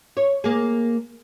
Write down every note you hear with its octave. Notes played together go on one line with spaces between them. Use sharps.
C#5
A#3 G#4